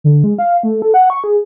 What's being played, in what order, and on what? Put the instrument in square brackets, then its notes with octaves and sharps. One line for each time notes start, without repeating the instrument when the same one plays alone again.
[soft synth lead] D3
G#3
F5
A3
A4
F#5
C#6
G#4